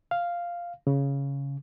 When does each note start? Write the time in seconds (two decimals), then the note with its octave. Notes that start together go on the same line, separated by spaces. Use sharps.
0.11 F5
0.87 C#3